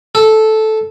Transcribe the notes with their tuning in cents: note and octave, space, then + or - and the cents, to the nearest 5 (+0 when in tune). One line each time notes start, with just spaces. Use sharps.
A4 -10